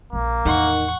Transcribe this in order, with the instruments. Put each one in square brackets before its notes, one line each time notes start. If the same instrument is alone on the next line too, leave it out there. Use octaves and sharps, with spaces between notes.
[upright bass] A#1 C#3 [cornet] A#3
[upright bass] E2 A2 [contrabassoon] D#3 [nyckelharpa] F#5 C#6